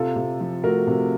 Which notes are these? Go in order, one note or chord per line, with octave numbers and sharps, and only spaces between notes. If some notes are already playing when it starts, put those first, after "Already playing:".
Already playing: C3 F4 A4
C3
F3
A3 F#4 A#4
C3